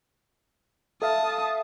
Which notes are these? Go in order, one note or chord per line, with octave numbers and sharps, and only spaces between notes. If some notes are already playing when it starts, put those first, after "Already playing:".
A4 E5 F5 A5 D#6